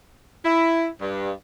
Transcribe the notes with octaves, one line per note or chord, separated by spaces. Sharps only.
E4
G2